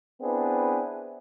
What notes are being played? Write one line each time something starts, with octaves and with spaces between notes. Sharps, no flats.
B3 C4 D4 E4 G#4 B4